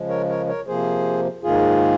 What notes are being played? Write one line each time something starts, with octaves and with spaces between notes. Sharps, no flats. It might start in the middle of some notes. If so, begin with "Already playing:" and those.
Already playing: C#3 F3 G#3
A#4 C#5
A#4 C#5
A#4 C#5
C3 F3 A#3 G#4 C5
G#2 D#3 A#3 F4 G#4